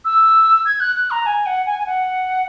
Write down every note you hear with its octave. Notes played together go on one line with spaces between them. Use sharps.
E6
G#6
F#6
F#6
A#5
G#5
F#5
G#5
G#5
F#5